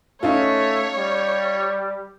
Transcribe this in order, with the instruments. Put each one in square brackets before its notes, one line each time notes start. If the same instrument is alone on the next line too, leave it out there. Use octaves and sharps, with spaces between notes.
[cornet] A3 [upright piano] C#4 D#4 F4 [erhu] C#5
[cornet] G3